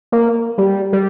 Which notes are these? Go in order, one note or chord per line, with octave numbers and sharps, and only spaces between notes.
A#3
G3
G3